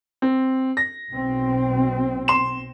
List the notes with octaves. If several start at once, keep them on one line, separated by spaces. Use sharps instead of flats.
C4
A#6
B1 B2 C4
C6 E7